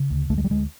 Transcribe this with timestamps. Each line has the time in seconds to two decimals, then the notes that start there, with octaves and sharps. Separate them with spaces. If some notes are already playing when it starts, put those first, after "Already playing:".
Already playing: C#3
0.11 D2
0.30 D2 A3
0.38 G#3
0.44 G3
0.50 D2 G#3